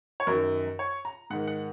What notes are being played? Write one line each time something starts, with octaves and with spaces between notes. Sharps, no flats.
C#5
F#2 D#3 A#4
C#5
A#5
G#2 D#3 F#5
F#5